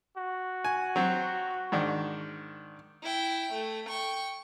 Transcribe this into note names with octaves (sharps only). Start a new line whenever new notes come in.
F#4
G#5
F#3 C4
G#2 D#3 D4
E4 G5
A3
G5 C#6